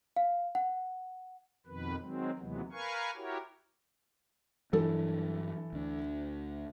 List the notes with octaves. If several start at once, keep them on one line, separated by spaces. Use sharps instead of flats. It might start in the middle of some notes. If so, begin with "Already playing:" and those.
F5
F#5
F2 B2 D#3 B4
D#3 F#3 G#3 C4
D#2 C3 E3 F#3 G#3 B3
A#4 B4 F5 G#5 C#6
E4 F#4 G4 A#4 C#5
G2 E3 F#3 D4 A4
D2 D4